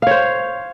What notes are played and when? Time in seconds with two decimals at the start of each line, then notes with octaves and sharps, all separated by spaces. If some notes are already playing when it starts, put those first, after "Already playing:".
0.02 F5
0.07 C#5
0.11 C5